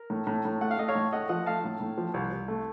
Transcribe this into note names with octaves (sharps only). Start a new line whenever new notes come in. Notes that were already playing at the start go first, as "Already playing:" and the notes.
Already playing: A#4
A2
A2
A2
A3 F#5
F5
A3 D#5
C#5 F5
A2
A3 D#5 F#5
F3 D#5 F#5
A3 F5 A5
A2
A2
F3
C2
C2
A3